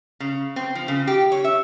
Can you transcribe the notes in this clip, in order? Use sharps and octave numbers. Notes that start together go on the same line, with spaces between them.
C#3
C4
F3
C#3
G4
C#5
E5